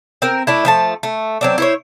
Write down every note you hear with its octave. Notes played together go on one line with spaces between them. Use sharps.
C4 A#4
A3 D4 E4
F3 A3 A5
A3
F#3 C4 D4
E4 C5 C#5